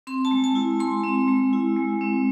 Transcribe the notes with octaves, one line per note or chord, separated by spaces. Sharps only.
C4 C6
A5
G#3
A5
E4
G#3 C6
C4
G#3
E4
G#3
C4